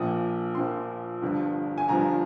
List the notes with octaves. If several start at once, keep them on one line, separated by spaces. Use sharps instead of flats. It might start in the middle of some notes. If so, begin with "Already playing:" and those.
Already playing: A#1 A#2 F3 D#6
A#1 A#2 F3 C6
G1 G2 F3
G#5
G1 G2 F3 A#5